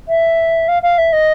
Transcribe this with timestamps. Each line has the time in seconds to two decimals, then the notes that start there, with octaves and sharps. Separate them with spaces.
0.08 E5
0.68 F5
0.82 F5
0.98 E5
1.13 D#5